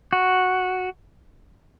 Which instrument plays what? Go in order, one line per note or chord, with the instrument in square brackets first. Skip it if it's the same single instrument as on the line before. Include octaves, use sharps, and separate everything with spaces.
[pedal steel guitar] F#4